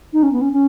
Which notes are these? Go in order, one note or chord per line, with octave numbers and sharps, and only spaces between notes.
D#4
C#4
B3
C#4
C#4